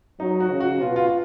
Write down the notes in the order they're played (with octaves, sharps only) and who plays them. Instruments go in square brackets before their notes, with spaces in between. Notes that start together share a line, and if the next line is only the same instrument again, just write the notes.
[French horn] F#3 [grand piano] D#4
[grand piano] F#4
[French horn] C#3
[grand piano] F#4
[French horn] B2 [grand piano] F4
[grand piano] F4
F4